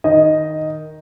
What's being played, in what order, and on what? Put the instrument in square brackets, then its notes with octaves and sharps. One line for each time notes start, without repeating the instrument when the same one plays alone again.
[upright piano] D#3 D#5